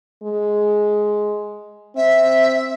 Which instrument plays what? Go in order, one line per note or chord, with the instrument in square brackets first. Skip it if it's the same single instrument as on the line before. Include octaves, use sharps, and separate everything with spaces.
[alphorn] G#3
[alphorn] C4 [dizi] E5